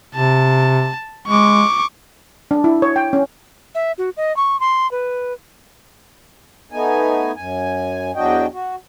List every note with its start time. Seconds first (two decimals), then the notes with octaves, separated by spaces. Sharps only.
0.15 C3 A5
1.27 G#3 C#6 D6
2.51 D4
2.64 E4
2.82 C#5
2.96 G5
3.13 C#4
3.75 E5
3.98 F#4
4.17 D#5
4.36 C#6
4.60 C6
4.91 B4
6.72 A3 B3 D#4 G#5
7.36 F#2 G#5
8.16 E2 F#3 D4 F#4 D#5 G5
8.53 F#4